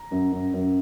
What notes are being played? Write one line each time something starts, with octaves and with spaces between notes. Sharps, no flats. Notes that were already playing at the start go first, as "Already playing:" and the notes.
Already playing: A#5
F#2
F#2
F#2